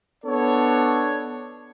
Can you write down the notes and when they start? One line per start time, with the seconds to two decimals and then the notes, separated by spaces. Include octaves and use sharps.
0.25 B3 D4 A4 C#5